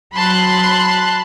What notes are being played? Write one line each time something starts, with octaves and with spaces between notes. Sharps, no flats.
F#3 A5 B5 C6 F#6